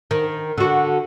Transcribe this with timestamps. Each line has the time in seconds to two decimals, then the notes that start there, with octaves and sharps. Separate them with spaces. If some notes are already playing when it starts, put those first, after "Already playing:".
0.11 D#3
0.58 D3 F#4